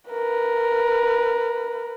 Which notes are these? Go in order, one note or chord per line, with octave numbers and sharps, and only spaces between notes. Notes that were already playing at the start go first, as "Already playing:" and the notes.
A#4 B4